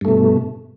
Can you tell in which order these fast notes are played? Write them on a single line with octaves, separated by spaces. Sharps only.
G2 A3 B2